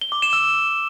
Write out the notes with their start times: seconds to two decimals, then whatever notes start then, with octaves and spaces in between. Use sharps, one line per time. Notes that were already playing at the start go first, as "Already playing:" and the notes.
0.02 G7
0.12 D6
0.22 E7
0.33 E6